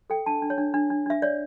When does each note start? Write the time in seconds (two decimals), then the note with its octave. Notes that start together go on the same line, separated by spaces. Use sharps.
0.10 A4 G5
0.26 D4 A5
0.42 D4
0.50 C#5
0.58 D4
0.74 D4
0.90 D4
1.06 D4 E5
1.22 C#5 D5